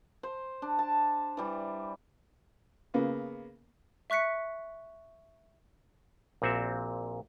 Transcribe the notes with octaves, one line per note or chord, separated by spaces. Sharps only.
C5
D4
A5
E3 G3
C#3 A#3 B3
E5 C#6 F#6 B6 C#7
A#1 A#2 C4 F#4 E5